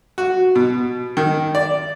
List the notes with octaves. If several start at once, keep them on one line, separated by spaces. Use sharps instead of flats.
F#4
B2
D#3
D5